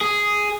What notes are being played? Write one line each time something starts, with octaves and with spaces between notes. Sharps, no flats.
G#4